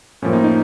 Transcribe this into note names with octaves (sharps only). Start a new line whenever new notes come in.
A2 F3 A#3 C#4
D#4
D#4